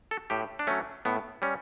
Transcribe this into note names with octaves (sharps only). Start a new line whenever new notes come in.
A4
A2 G4
D4
F#3 A3 C#4
A2 B3
G3 C#4